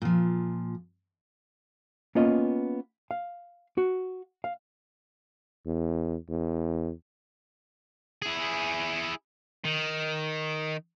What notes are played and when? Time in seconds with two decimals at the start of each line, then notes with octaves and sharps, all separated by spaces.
0.02 A#2 F3
2.15 A#3 B3 C#4 F4 D#5
3.11 F5
3.78 F#4
4.44 F5
5.67 E2
6.29 E2
8.22 E4 G#4
9.65 D#3